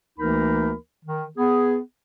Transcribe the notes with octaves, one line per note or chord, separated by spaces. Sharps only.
D2 E3 A#3 D#4 A#4 B5
D#3
B3 G#4